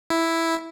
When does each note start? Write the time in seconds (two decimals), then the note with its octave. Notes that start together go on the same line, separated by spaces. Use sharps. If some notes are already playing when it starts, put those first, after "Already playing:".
0.10 E4